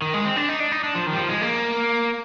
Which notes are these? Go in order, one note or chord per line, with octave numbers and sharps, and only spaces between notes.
D#3
G#3
C4
D4
D#4
D4
D#4
D4
F3
D#3
G3
F3
G#3
A#3